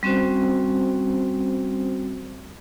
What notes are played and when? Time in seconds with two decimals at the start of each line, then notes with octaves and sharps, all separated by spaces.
0.03 G3 C4 C#4 F#4 C5